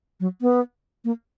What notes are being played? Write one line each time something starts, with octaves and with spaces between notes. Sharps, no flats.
F#3
B3
A#3